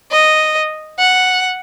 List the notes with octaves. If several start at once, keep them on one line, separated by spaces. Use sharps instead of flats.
D#5
F#5